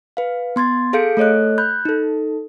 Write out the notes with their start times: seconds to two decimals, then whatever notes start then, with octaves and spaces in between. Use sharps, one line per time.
0.17 B4 F5
0.56 B3 C6 G#6 A6
0.93 G#4 A4 F5 G6 C#7 D7
1.17 A3 A4 C#5 D#5 F#6
1.58 B5 F#6 G6
1.85 D#4 A4